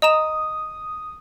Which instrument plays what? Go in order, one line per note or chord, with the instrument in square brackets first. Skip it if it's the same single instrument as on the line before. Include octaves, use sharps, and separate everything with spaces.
[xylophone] D#5 A#5 E7 [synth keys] D#6